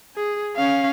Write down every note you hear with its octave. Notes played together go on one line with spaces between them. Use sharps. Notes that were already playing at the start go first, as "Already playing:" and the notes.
G#4
C#4 F5